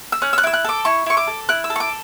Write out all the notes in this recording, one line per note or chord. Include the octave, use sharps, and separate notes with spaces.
E6
C#4 F#6
E6
F#6
E4 E6
F#6
A4 D6
E4 C#6
E4 C#6
D6
A4
E4 F#6
E6
A4
C#6
D6